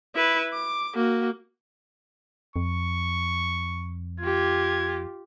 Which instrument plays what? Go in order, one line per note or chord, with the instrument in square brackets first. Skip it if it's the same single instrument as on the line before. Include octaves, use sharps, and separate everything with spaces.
[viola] E4 B4
D6
A#3 F#4
[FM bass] F2 [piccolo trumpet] C#6
[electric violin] F4 G4 [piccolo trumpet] G#6